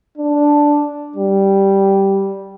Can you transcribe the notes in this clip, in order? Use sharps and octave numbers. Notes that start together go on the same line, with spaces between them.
D4
G3